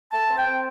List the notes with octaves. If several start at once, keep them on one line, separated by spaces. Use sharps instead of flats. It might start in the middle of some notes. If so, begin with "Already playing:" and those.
A3 A5
C4
G5
C4